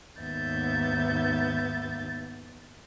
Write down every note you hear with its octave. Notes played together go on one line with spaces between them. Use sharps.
D#2 G#2 B3 E5 G6 A6